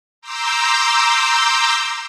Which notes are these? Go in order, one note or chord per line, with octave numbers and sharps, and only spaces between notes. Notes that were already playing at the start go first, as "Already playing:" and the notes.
A#5 C6 D6 E6 G6